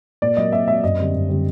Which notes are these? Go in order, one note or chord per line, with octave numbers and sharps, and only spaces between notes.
A#2 D5
F#3 A#3 D#5
A#2 E5
F#3 A#3 E5
F#2 D#5
D3 G3 C4
F#2
D3 G3 C4